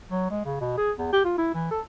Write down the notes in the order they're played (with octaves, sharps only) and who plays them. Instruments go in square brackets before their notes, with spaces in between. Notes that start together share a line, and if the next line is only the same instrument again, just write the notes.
[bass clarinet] F#3
G#3
C#3
B2
G#4
E2
G4
F4
E4
E3
A4